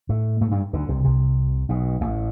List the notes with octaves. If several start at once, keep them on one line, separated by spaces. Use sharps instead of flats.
A2 A3
A2 A3
G2 G3
D2 D3
C2 C3
C2 C3
B1 B2
A1 A2